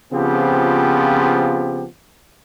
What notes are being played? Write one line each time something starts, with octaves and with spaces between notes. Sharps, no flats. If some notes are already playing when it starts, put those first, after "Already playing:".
C#3 F3 B3 C4 F4 G4